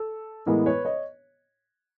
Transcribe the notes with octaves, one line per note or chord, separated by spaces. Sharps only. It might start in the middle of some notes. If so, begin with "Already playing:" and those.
Already playing: A4
A2 E3 G#3 B3 A#4
B4 C#5
C#5 D#5